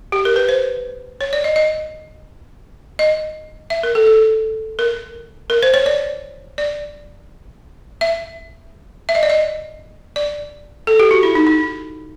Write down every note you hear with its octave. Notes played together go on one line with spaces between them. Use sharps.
G4
A#4
B4
C5
C#5
D5
D#5
D#5
D#5
E5
A#4
A4
A4
A#4
A#4
C5
C#5
D5
D5
E5
E5
D#5
D5
D#5
D5
A4
G4
F#4
E4
D#4
D#4